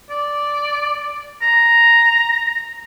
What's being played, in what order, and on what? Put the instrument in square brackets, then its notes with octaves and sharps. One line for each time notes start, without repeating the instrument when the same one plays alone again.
[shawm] D5
A#5